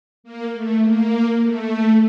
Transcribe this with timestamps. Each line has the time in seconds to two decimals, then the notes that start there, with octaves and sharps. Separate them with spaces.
0.24 A#3
0.54 A3
0.83 A#3
1.42 A3